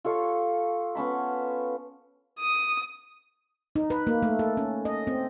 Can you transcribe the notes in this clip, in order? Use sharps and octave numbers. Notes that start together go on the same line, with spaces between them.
F4 A4 C#5 F5
B3 C#4 A5 B5
D#6
D#4
B4
A#3
A3
A4
C#4
D#5
C4